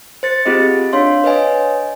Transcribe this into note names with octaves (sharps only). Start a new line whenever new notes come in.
C5 A6 C#7
C4 F4 G4 G#4 D#5
D4 C#5 F5 C6
B4 C#5 D#5 G#5